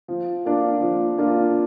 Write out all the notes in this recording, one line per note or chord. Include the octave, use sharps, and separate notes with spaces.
F3
A#3 D4 F4
F3
A#3 D4 F4